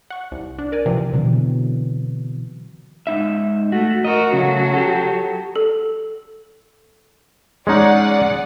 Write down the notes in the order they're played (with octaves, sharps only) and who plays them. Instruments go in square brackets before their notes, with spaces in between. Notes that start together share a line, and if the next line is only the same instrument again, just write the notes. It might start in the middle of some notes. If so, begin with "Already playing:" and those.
[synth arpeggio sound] F#5 C#6
C2
D4
A#4 D5 G#5
C3 E3 F3
[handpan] B2 D3 E3 F#3 C4
[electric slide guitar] G#2 D#4 E5
[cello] A3 [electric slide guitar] F#4
[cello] F#4 A#4 [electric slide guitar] D#5
[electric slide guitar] C#3 A3 [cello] F#3 F#4
[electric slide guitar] G4 A4
[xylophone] A4
[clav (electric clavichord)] G#3 C#4 D#4 [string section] G#4 D5 F#5